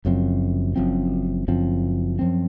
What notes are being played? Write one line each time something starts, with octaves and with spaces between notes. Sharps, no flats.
F#1 F#2 F3 C4
F#1 F#2 F3 C4
F#1 F#2 F3 C4
F#2 F3 C4